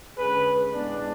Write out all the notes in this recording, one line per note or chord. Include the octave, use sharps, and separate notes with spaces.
D3 G#3 C#4 G#4 B4
A2 G#3 B3 D4